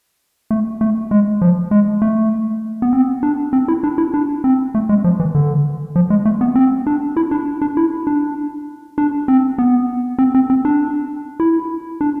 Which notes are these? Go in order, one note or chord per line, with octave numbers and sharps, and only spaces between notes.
A3
A3
G#3
F3
G#3
A3
B3
C4
D4
C4
E4
D4
E4
D4
C4
A3
G#3
F3
E3
D3
F3
G#3
A3
B3
C4
D4
E4
D4
D4
E4
D4
D4
C4
B3
C4
C4
C4
D4
E4
D4